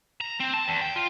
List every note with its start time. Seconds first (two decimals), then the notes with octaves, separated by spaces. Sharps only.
0.21 A#5
0.40 C4
0.54 A5
0.68 E2
0.81 G5
0.95 F4